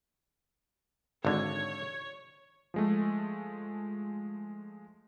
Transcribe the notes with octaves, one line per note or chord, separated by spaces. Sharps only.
G#1 D3 C#5
F3 G#3 A3